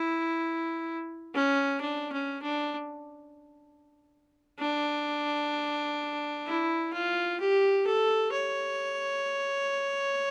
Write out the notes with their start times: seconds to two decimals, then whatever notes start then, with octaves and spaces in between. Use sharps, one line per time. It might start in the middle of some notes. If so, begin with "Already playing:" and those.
Already playing: E4
1.34 C#4
1.81 D4
2.12 C#4
2.42 D4
4.60 D4
6.46 E4
6.93 F4
7.40 G4
7.87 A4
8.33 C#5